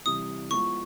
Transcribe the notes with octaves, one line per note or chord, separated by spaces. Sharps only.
C3 E3 G3 D#6
F3 G#3 B3 E4 C#6